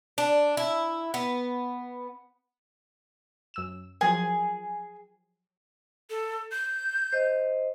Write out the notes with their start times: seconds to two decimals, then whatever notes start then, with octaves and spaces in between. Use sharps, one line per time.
0.18 D4
0.57 E4
1.14 B3
3.54 F#2 E6 E7
4.01 F3 F#3 G#4 A#4
6.10 A4
6.52 G6
7.13 C5 D#5